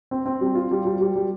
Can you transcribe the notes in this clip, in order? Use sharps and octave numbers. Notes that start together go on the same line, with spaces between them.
C4
C4
G3
F4
G3
G3
G3
G3